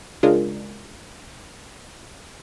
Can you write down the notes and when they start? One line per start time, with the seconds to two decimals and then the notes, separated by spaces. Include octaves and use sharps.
0.23 C#3 G#3 D4 F4 G#4 A#4